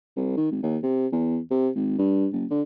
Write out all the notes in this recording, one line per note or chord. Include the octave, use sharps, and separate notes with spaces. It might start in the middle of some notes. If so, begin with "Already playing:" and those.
C2
D#3
G#1
D#2
C3
E2
C3
G#1
G2
F#1
D3